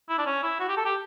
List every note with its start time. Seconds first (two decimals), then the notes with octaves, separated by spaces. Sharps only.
0.09 E4
0.18 D4
0.26 C#4
0.43 E4
0.60 F#4
0.68 G4
0.77 A4
0.85 G4